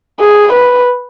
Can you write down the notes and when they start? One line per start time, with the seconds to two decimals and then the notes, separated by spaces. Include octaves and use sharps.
0.20 G#4
0.53 B4